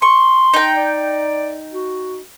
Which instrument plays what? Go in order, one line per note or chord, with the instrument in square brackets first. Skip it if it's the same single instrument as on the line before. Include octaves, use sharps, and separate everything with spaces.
[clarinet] C6 [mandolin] C#6
[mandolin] D#4 G5
[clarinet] D5
F#4